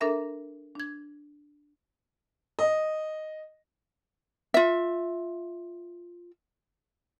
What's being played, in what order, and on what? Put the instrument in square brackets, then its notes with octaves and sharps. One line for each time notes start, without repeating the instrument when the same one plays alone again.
[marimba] D4 A4 A#4 E5 A#5
D4 G#6
[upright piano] D#5
[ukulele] F4 E5